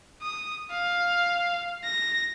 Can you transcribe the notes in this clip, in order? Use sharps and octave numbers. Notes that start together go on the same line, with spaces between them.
D#6
F5
A#6